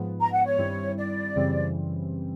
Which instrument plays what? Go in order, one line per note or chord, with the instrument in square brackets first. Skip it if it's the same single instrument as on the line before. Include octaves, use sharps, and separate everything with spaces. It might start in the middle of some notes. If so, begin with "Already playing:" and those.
Already playing: [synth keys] G#2 F3 G#3 B3
[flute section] A#5
F#5
C#5
[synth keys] G2 D#3 G3 C4 E4
[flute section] D5
[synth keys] F#2 C#3 E3 G3 C4